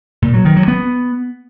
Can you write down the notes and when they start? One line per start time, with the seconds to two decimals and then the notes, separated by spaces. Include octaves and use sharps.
0.22 A#2
0.34 F#3
0.45 D#3
0.56 F#3
0.68 B3